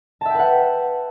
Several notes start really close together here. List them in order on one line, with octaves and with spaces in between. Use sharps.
A5 E5 G5 B4 F#5